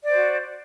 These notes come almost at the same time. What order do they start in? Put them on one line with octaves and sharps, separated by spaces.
D5 C5 F#4